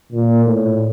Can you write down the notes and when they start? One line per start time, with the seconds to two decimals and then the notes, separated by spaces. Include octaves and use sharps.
0.12 A#2
0.45 A2